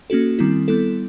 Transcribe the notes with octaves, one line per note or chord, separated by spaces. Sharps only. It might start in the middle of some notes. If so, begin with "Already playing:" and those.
A#3 C#4 F#4 A4
D#3 G3 C4 E4
G3 B3 E4 A4